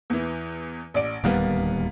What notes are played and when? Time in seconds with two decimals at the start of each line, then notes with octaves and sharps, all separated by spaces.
0.10 E2 E3
0.94 A1 D5 D7
1.24 D1 D#2 G3 A#3 B3